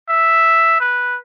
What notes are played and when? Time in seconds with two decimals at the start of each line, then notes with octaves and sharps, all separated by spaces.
0.09 E5
0.80 B4